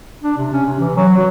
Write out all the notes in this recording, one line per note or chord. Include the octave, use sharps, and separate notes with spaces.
D4
C3
C#4
C3
E3
F#3
F#4